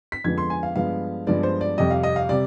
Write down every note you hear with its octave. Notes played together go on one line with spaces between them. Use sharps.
B6
F2 D3 F3 G#3 B3 G#6
C6
G#5
F5
G2 F3 G#3 B3 F5
G2 F3 G#3 B3 D5
C5
D5
F2 C3 G3 D#5
F5
D#5
F5
C3 G3 D5